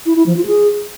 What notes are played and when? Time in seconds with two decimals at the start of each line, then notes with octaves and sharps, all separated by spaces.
0.06 E4
0.16 E4
0.26 F3
0.37 F4
0.47 G#4